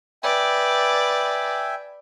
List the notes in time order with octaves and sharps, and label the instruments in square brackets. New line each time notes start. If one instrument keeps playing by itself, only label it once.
[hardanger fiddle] B4 D5 [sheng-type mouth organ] E5 G5 G#5